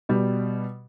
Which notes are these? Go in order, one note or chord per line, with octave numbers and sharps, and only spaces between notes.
B2 G3